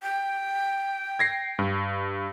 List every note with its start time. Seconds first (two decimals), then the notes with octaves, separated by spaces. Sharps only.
0.03 G5
1.19 G#6 A#6 C7
1.59 G2